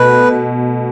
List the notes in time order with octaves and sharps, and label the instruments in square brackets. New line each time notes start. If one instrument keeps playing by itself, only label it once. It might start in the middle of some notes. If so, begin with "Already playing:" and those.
Already playing: [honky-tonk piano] B2 A3 [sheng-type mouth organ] B4